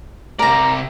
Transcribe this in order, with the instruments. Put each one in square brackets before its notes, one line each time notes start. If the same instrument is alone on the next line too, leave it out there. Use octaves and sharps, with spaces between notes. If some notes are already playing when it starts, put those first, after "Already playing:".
[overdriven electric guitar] C3 D5 [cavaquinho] A#4 A#5